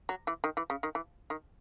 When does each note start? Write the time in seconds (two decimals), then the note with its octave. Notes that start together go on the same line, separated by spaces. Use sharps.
0.09 F#3
0.27 E3
0.44 D#3
0.57 E3
0.70 C#3
0.83 D#3
0.95 E3
1.30 D#3